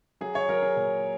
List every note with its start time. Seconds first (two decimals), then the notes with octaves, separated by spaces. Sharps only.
0.21 F#3 G#4
0.35 C#5
0.49 F#3 A#4
0.62 G#4
0.77 A#2